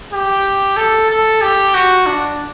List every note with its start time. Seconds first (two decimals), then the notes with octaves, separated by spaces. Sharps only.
0.12 G4
0.77 A4
1.10 A4
1.42 G4
1.75 F#4
2.06 D4